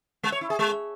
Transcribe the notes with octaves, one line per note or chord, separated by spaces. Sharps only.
G#3
C#5
E4
G#4
G#3